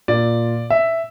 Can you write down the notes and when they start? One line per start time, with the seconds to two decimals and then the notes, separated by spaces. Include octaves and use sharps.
0.08 A#2 D5
0.70 E5